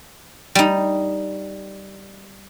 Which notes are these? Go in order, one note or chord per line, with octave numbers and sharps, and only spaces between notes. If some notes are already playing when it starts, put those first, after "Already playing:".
G3 D#4